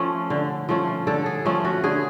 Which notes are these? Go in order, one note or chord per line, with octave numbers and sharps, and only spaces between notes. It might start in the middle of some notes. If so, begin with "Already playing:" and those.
Already playing: F3 A3 C#4
D3
F3 A3 C#4
D3 A4
G#4
F3 A3 C#4
F#4
D3 G#4